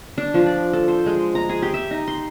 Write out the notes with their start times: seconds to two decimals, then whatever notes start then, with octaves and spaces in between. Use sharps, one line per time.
0.18 D4
0.34 F3
0.46 D5
0.73 A4
0.88 C5
1.06 G#3
1.35 A#5
1.49 G#4
1.62 G4
1.74 E5
1.91 D#4
2.08 C6